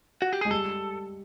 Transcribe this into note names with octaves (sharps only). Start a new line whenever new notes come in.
F#4
G4
G#3 G#4
G3 A4